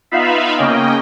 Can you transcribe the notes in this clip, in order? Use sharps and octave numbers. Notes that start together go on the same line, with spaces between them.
B3 D#4 F4 E5 F5 B5
C#3 A#3 C#4 D#5 G5